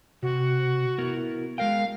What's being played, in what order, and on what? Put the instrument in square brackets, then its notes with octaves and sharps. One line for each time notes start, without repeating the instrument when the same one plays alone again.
[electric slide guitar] C3 [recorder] F#4
[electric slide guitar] B3 E4 A#4
[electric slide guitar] G#3 A#4 G5 [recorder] F5